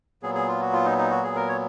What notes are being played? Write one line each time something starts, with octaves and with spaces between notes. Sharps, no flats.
A#2 F#3 B3 G#4
G#4
F4
F#4
F4
D#4
D#4
F#4
G#4
A#4
C#5